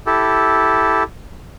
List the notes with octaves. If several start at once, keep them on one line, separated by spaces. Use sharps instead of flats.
E4 G4 A4